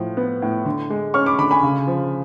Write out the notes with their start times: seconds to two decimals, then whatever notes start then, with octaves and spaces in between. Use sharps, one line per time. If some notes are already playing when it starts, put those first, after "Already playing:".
Already playing: A2 F3
0.17 B3
0.42 A2
0.65 D3
0.90 G#3
1.14 C#4 C#6 F6
1.26 B5 D6
1.38 D3 B5 D6
1.51 G#5 B5
1.63 C#3
1.87 F3